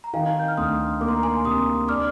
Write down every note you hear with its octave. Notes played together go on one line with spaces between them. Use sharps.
A#5
D#3 F5 G#5
G6
F6
D2 C6 D#6
A#3 D6
C6
A#5
G#5 C6
C3 C6 D#6
D4 D6 F6